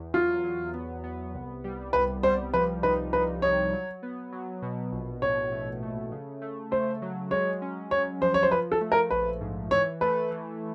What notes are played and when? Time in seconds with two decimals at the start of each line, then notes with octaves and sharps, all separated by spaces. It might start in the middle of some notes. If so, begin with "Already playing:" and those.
Already playing: E2
0.14 F#3 F4
0.44 F#3
0.74 B3
1.04 B3
1.34 C2
1.64 G3
1.93 C2 B4
2.23 G3 C5
2.53 F3 B4
2.83 D#4 B4
3.13 D#4 B4
3.42 D#4 C#5
3.73 F#3
4.03 B3
4.32 F#3
4.62 B2
4.92 A#1
5.22 A2 C#5
5.52 A3
5.83 A3
6.12 C#3
6.42 A3
6.71 A3 C5
7.02 F#3
7.31 G#3 C#5
7.62 C#4
7.91 G#3 C#5
8.21 F3 C5
8.34 C#5
8.43 C5
8.51 F3 B4
8.72 A4
8.81 A3
8.92 A#4
9.11 A#1 B4
9.41 G#2
9.71 E3 C#5
10.01 A3 B4
10.31 E3